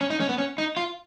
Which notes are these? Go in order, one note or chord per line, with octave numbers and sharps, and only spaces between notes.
C#4
D#4
C#4
B3
C#4
D#4
F4